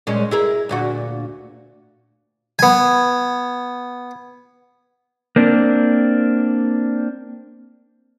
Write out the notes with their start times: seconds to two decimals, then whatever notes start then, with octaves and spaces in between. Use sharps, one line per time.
0.07 A#2 G#3 C#4
0.31 E4 G#4 A#4
0.69 D2 A#2 F#4
2.59 B3 G#5
5.36 A#3 C4 D4